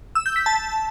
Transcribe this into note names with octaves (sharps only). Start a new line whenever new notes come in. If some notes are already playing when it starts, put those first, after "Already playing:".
E6
G6
B6
A5